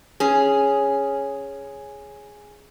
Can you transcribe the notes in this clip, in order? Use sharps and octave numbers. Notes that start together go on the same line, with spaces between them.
C#4 G#4